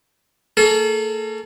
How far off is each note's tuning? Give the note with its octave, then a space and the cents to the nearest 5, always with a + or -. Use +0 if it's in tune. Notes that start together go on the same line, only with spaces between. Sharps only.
A#3 -45 A4 -40